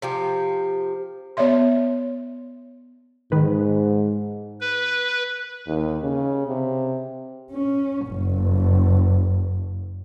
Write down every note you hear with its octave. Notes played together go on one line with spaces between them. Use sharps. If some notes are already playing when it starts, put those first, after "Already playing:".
C3 F3 G4
B3 C#5 D5 E5 C6
G#2 D#3 B4
B4
D#2
C#3
C3
C#4
F#1